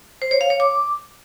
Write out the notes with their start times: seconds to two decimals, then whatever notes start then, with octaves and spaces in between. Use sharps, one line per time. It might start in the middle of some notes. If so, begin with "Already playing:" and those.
0.22 C5
0.31 C#5
0.41 F5
0.50 C#5
0.60 D6